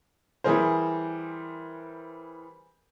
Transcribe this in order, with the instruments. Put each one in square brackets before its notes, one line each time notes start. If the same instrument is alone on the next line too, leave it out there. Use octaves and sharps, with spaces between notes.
[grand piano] E3 G3 G#4 A#4 C5